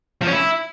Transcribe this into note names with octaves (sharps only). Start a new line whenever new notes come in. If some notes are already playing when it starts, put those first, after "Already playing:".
F3
C#4
E4